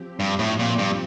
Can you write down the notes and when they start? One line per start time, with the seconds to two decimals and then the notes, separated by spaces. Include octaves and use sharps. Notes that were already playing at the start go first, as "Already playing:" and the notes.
Already playing: F3 C4 G4
0.20 G2
0.39 A2
0.59 A#2
0.79 G2